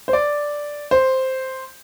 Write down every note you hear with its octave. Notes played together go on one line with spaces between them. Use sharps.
C5
D5
C5